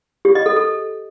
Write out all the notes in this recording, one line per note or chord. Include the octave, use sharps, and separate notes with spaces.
G4
D#5
A4
A4